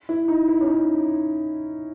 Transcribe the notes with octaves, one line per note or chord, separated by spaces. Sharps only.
E4
D#4
E4
C#4
D#4